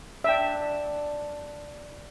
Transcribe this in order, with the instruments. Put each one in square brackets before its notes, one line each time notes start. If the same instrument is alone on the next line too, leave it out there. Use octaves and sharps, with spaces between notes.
[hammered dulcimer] D4 [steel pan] E5 G5